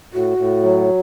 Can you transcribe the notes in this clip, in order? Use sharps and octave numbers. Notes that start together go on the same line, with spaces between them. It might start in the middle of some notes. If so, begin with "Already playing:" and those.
A2 F#4
A2
F#3